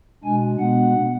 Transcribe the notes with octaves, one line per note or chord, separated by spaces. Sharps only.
B2 G#3 D4 G#5
B2 G#3 B3 D4 F#5